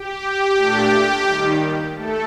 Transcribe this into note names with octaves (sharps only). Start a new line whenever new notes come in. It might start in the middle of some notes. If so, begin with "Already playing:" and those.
Already playing: G4
A#2 A3 D4
D#2 D#3 G3
A3 A4